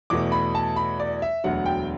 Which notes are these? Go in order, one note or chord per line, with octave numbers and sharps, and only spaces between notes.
E2 B2 A3 D6
B5
A5
B5
D5
E5
E1 D2 D3 F#3 F#5
G5